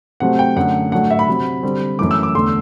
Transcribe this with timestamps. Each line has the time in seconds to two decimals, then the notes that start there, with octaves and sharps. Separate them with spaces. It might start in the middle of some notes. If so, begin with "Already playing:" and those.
0.20 C3 F#3 A3 C4 F#5
0.39 G5
0.56 F#2 D3 A3 F#5
0.92 A2 F#3 A3 D4 F#5
1.11 E5
1.19 B5
1.28 C3 F#3 C4
1.63 D3 G3 C4
1.99 F#2 E3 A3 D6
2.11 E6
2.23 D6
2.35 E2 D3 A3 C6